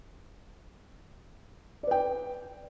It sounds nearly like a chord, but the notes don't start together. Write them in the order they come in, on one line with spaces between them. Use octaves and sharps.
D5 B4 G5